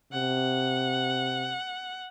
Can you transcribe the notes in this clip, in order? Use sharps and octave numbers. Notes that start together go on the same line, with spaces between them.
C3 F#5